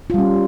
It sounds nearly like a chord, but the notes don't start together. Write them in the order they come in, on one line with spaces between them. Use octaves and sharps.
F4 G3 C#4